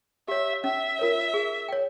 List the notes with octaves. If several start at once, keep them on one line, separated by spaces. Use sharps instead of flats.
G4 C#5 E5
C#4 E5
F4 A#4 C#5
G#4
C#5 G5